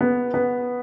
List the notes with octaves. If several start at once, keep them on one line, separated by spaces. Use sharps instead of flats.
B3
B3